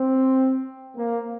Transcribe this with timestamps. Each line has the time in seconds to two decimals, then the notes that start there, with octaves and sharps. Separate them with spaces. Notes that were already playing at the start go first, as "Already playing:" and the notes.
Already playing: C4
0.97 A#3